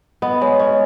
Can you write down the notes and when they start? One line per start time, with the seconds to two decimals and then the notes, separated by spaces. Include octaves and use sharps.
0.22 B3 D#5
0.41 G#3 C#5
0.60 C#4 D#5